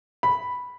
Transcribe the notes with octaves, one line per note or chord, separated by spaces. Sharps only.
B5